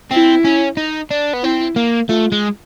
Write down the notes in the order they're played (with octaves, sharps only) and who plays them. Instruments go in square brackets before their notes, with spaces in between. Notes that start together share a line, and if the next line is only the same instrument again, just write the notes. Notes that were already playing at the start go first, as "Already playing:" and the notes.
[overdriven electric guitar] C4 [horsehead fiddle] E4
[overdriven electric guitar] C#4
D#4
D4
B3
[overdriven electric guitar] C4 [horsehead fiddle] E4
[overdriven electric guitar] A#3
[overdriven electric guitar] A3 [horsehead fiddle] F4
[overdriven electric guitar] G#3